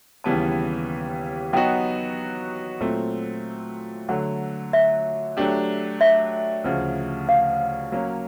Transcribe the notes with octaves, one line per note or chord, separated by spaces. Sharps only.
D#2 C#3 E3 G3 B3 A5
F#3 B3 D#4 F#4 G5
A#2 F#3 A3 C4
D3 F#3 A3 F#5
E5
F#3 A3 D4 G4
E5
D2 C#3 F3
F5
F#3 A#3 C#4